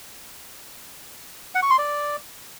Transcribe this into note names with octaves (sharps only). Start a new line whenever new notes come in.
F#5
C#6
C6
D5